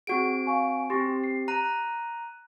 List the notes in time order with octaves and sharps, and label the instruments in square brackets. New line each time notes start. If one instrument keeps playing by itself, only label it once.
[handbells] C4 F#4 D7 [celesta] G#4 F#5 C#6
[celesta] F5 G#5 C#6
[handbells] C4 G4 [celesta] C6 C#6 A#6
[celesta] C7
[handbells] A#5 [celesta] F#6 D#7